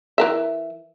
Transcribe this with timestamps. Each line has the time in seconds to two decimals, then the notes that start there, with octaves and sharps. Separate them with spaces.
0.18 E3 A#4 E5